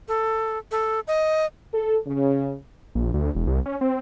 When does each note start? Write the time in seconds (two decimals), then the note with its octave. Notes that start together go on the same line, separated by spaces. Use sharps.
0.08 A4
0.71 A4
1.08 D#5
1.74 A4
2.07 C#3
2.95 A#1
3.14 D2
3.35 E1
3.47 C2
3.66 C#4
3.81 C4